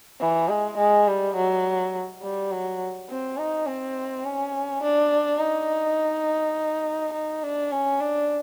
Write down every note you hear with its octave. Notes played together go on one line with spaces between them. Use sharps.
E3
G#3
G#3
G3
F#3
G3
F#3
C4
D#4
C4
C#4
D4
D#4
D#4
D4
C#4
D4